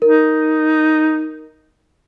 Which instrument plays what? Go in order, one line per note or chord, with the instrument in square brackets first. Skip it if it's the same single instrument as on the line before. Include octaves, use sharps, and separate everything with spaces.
[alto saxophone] D#4 [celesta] A#4